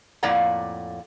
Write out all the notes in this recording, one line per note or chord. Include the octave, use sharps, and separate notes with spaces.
F2 A2 A#3 D5 F#5 A#5